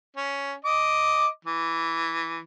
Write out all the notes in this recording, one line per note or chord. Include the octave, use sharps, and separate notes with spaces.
C#4
D#5 D6
E3